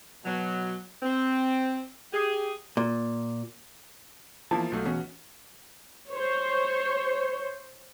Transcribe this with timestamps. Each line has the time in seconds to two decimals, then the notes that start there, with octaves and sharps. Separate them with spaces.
0.24 B2 F#3
1.03 C4
2.12 G4 G#4
2.77 A#2
4.51 E2 F3 A#3 E4 F4 A5
4.72 B1 F#3 A3
4.85 E2 B2 C#4 F#4
6.10 C5 C#5